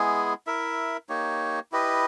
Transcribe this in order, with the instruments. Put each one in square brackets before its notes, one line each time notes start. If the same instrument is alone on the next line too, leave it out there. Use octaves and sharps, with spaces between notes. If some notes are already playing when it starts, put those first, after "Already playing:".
Already playing: [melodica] G#3 B3 E4 G#4
E4 A#4 E5
A#3 D#4 G4 C#5
E4 G4 B4 D#5